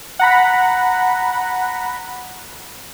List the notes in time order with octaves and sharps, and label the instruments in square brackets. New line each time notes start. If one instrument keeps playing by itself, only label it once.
[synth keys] F#5 A#5 B5